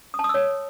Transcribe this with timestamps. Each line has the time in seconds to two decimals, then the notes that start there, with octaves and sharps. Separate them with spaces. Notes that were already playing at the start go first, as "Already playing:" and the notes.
0.14 D#6
0.19 A5
0.24 D#6
0.29 E6
0.34 C#5